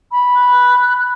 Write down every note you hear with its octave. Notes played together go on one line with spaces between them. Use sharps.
B5
F#6